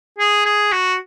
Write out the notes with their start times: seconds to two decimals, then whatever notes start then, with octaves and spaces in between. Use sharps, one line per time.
0.18 G#4
0.45 G#4
0.72 F#4